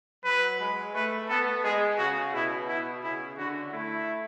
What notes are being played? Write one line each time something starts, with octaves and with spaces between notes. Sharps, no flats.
F#3 B4
G#3
A3 B4
B3 A4
G#3 G#4
C#3 F#4
B2 E4
E4
C#3 E4
D3 F#4
A3 E4